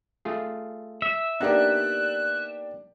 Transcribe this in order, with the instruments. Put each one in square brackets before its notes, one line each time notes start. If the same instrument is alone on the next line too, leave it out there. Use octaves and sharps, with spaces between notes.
[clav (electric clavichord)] A3 F4 G#4
[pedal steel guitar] E5
[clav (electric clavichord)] A#3 B3 D#4 [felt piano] D4 G4 D5 [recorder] F#6